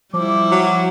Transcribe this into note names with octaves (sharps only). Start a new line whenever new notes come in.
F3 G3 E4 D6
F#3